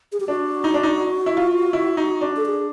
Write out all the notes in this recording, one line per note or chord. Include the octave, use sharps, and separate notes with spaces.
G#4
G4
D4 F#4
D#4
D4
D#4
E4
F4
E4
D#4
D4
A4
G#4